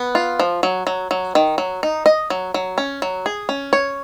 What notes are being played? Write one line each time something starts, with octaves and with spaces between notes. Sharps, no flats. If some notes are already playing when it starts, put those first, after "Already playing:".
Already playing: B3
F4
F3
F#3
F#3
F#3
D#3
F#3
D#4
D#5
F#3
F#3
C#4
F#3
G#4
C#4
C#5